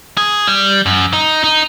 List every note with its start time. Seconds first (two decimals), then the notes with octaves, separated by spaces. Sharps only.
0.17 G#4
0.47 G3
0.86 F#2
1.13 D#4
1.44 D#4